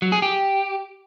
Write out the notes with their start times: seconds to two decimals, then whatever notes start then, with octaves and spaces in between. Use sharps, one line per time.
0.02 F#3
0.12 G#4
0.22 G4